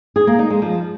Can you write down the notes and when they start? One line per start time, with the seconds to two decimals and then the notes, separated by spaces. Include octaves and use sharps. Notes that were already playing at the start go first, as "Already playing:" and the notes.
0.16 G#4
0.27 A#3
0.39 D#4
0.50 G#3
0.62 F3